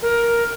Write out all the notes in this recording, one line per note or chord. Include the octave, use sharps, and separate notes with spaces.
A#4